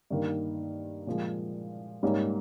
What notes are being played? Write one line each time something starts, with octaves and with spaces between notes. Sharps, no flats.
G2 D#3 A#3
A#2 F3 G#3
G#2 G3 A#3 C#4